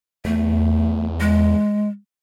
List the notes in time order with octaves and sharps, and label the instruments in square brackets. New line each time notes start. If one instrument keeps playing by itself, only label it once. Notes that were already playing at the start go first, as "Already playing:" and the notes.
[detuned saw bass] E2 [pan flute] A3
[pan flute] G#3